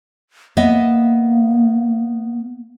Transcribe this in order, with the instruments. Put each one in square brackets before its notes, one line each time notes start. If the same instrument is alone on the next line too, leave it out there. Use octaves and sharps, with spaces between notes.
[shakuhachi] A#3 [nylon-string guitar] B3 D#5 E5